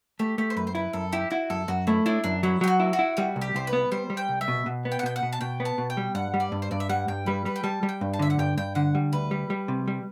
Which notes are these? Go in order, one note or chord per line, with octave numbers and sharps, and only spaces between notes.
A3 G4
A3 G4
C5
F#2 B4
C5
E4 B4
F#2 A4
E4 G4
E4 F#4
F#2 A4
F#2 F#4
A3 E4
D4 E4
F#2 D4
F#3 E4
F#3 G4
F#4
E4
F#4
E4
G3 F#4
C2
G4
C2 C5
B4
B3
G3 C5
G3
G5
C2
E5
B2
B2
B3
G5
F#5
B2 G5
F#5
B2
A5
B2 G5
B3
A5
B2
G5
G3
G2 F#5
G3
D5
G2
C5
G2 D5
E5
G3 F#5
G2 G5
G3 B4
G3 B4
G5
G3 A5
G3
G5
G2
A5
D3 E5
F#5
G2 G5
G2 G5
D3 F#5
G3
D2 B4
G3
G3
C3
G3